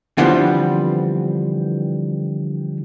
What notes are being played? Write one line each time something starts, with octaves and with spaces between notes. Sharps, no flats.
D3 E3 F3 G3 B3 C4